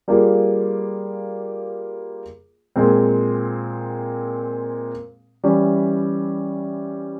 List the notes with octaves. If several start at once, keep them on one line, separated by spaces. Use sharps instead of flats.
G3 A#3 F4 G#4
A#2 G#3 C4
E3 G3 C#4 E4